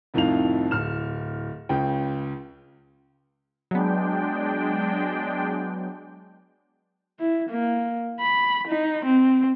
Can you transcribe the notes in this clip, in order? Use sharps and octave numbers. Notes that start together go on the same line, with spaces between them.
C2 F2 A2 D#4 F5 F7
D1 F6 E7
C#2 C#3 G5
F#3 G#3 B3 D4 G5
E4
A#3
B5
D#4
C4